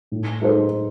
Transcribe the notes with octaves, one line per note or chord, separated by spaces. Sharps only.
A2
G#3 D#4 A4 C5